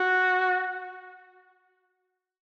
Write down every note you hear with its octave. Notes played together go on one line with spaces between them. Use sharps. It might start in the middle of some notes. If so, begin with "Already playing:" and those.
Already playing: F#4